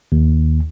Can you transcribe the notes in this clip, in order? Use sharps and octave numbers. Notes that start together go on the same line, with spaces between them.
D#2